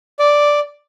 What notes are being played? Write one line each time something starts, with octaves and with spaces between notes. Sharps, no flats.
D5